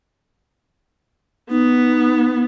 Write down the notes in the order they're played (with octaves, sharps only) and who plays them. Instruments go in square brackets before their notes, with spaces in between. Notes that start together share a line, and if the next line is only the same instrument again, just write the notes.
[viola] B3 [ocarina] D#4